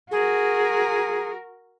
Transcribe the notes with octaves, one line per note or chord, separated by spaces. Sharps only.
F#4 G#4 A#4